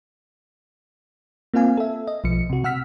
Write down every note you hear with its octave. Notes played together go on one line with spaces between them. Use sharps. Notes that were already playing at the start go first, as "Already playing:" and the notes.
A#3 C4 F4 F5 G#5
A4 E5
D#5
B1 F3 C#7
C3 F#4
C3 F#5 E6 F6 B6